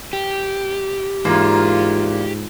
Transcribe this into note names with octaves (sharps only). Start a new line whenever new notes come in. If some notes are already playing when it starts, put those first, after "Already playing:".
G4
E2 G#2 A#3 F4